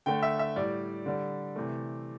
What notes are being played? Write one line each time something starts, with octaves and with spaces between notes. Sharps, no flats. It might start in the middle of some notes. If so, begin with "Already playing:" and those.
D3 A3 G5
E5
E5
A2 G3 D5
D3 G3
C3 E3 A3